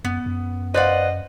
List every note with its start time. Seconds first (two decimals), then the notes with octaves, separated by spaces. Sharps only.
0.04 F#2 B3
0.26 F#2
0.74 B4 C5 D5 D#5 F5 F#5